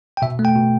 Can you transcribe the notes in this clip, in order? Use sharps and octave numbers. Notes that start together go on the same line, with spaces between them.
G5
B2 E5
A3
G5
B2